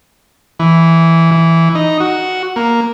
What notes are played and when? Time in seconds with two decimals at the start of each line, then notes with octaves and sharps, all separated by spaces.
0.59 E3
1.32 E3
1.75 D#4
2.00 F#4
2.56 A#3